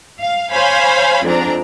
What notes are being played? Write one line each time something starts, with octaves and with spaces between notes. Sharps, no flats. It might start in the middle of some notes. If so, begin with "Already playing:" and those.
F5
C5 C#5 F5 G#5 B5
F2 G#2 C4 D4 A#5